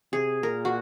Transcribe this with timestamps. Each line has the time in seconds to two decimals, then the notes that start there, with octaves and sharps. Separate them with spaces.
0.13 C3 G#4
0.43 A#2 A#4
0.65 F#4